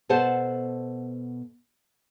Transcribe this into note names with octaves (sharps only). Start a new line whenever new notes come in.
B2 B3 A4 C5 F#5 A5